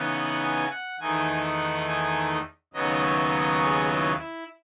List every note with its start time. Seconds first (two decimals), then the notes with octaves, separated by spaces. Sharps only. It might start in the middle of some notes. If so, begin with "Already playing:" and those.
Already playing: C#3 E3 B3 D#4
0.13 F#5
0.42 G#5
0.71 F#5
1.00 E2 D#3 A3 D#4 G#5
1.43 F#5
1.87 G#5
2.73 D#2 C#3 F#3 B3 D#4 D#5
3.03 E5
3.30 D#5
3.60 G#4
3.89 E4
4.18 E4